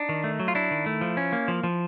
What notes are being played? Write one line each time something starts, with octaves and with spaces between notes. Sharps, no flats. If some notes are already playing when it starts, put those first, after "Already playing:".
Already playing: D4 D#4
D#3
A3
F#3
F4
D4 E4
D#3
A3
F3
C#4
A#3
F3
F3